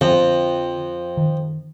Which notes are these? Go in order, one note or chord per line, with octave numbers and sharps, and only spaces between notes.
F2 D3
D#3